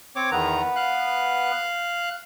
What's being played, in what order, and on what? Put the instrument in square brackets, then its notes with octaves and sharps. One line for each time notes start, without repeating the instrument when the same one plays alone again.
[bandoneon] C4 C#5 D6
[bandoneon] E2 D#3 A#5 [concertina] B3 B4
[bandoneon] F5 F#6